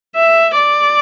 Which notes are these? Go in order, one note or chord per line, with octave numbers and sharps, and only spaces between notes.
E5
D5